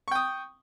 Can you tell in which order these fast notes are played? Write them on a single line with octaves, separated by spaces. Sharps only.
C#6 G5 D#6